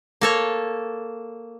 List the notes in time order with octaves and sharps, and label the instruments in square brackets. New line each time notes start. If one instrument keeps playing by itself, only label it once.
[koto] A#3 A4 C#5